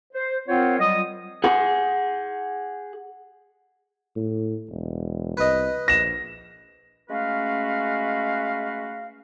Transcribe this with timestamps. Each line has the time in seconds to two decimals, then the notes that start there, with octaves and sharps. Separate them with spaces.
0.13 C5
0.48 C4 F4 A#4 C5 C#5 F#5
0.80 F#3 G3 F4 D#5 D#6
1.44 G#4 F#5
4.16 A2
4.70 E1
5.37 C2 B4 D#5
5.88 A#1 A#6 E7
7.09 G#3 A3 C#4 F#4 B4 F5